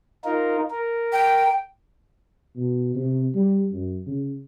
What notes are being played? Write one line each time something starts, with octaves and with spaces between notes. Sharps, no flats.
D#4 F4 A#4
A#4
G5
B2
C3
G3
F#2
C#3